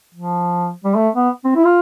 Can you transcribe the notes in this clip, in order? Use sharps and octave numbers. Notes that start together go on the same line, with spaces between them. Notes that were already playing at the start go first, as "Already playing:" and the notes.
F3
G3
A3
B3
C4
E4
F4